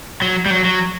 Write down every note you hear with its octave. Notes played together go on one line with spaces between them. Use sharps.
F#3
G3
F#3
F#3